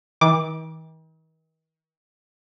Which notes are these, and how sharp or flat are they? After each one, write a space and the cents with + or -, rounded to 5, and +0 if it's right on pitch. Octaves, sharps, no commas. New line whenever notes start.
D#3 +45 D6 +0